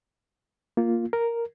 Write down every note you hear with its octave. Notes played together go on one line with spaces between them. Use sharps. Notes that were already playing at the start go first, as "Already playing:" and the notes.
A#3 F4
A#4